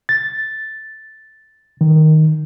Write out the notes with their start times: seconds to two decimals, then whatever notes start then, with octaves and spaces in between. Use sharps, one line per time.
0.09 A6
1.81 D#3